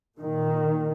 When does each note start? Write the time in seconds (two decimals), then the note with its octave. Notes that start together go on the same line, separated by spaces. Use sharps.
0.19 A#2 D#3